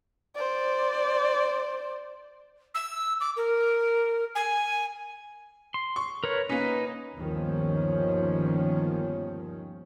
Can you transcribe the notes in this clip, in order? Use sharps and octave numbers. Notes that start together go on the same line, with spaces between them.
C5 D5
E6
D6
A#4
G#5
C6
C#6
A#4 B4 C#5
A#3 C#4 D#4 B4
G1 D#2 D#3 F3 C#4